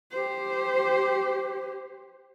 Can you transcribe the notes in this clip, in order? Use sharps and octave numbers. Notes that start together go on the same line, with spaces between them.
G4 C5